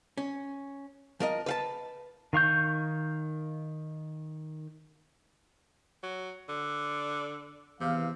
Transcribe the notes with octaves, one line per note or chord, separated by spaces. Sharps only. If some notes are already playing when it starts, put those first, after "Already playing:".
C#4
F3 A#4 D#5
B4 F5 A5
D#3 F5 C#6 G6
F#3
D3
E2 C3 F5